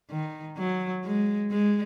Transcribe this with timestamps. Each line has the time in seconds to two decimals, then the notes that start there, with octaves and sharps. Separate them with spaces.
0.10 D#3
0.57 F#3
1.04 G#3
1.51 G#3